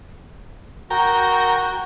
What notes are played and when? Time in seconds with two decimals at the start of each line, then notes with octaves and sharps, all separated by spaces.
0.90 F#4 A#4 G5